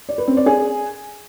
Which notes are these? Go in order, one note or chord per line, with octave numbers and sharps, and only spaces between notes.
D5
B4
C4
D5
G#4